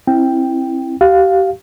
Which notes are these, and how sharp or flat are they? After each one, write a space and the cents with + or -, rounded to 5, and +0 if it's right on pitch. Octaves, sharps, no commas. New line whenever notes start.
C4 +30 E4 +0 G5 +0
G4 -30 F5 +0